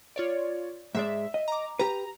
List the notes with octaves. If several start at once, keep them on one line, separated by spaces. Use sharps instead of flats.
F4 C#5 D5
G#2 G#3 D5 E5
D#5
A#5 D6
G4 B4 A#5